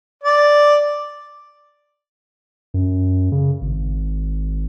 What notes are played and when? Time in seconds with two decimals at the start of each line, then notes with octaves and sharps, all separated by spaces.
0.24 D5
2.74 F#2
3.32 C#3
3.61 G#1